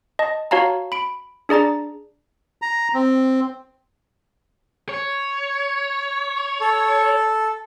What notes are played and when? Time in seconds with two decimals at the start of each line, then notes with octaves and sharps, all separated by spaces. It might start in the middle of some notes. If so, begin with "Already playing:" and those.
0.19 D#5 A5
0.51 F#4 C#5 F5 A5 A#5
0.92 B5 D7
1.49 D4 G#4 D5 A#5 A6
2.62 A#5
2.94 C4
4.89 C#5
6.61 A4